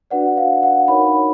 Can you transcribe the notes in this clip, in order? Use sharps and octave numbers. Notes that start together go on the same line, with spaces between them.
D4 F#4 B4 D5 F#5
F5
F#5
D#4 F#4 A#4 C#5 B5